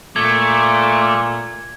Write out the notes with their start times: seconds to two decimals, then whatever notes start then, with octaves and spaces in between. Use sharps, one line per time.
0.16 A#2 A3 D6 G#6